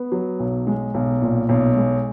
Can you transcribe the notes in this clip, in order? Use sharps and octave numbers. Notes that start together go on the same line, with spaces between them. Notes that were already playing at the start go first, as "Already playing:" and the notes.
Already playing: B3
F#3
B1
G#3
B1
A#2
B1
G#3